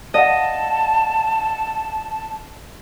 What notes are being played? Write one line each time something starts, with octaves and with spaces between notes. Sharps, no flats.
D5 D#5 F5 F#5 A5